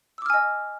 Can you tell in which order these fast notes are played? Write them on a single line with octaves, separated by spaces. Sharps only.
E6 D6 F6 G#5 D#5